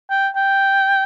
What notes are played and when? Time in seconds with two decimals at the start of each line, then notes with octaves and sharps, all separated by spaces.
0.10 G5
0.36 G5